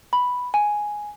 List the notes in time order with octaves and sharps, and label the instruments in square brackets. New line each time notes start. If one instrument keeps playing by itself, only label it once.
[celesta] B5
G#5